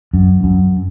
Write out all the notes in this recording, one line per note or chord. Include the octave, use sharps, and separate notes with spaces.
F#2
F#2